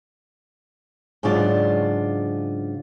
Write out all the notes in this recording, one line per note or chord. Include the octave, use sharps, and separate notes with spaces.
G#2 C#3 F#3 D4 F4 D5